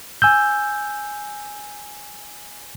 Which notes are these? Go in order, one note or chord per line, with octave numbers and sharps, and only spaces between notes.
G#5 E6 G6